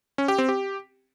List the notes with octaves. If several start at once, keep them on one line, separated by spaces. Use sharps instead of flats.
C#4
G4
C4
G4